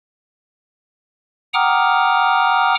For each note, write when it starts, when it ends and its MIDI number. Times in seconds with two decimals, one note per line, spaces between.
1.54 2.75 78
1.54 2.75 79
1.54 2.75 82
1.54 2.75 86
1.54 2.75 87
1.54 2.75 89